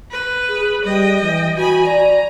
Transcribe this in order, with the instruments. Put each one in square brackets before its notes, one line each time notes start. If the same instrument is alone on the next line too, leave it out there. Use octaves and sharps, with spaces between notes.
[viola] B4
[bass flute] G#4
[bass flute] G3 [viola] D#5 G5
[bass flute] E3
[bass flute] F#4 [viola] G#5 B5
[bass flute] D5 [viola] A#5